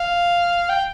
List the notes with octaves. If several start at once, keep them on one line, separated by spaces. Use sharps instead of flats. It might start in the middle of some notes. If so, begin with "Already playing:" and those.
Already playing: F5
G5